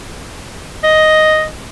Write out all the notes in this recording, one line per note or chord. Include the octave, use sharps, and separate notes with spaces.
D#5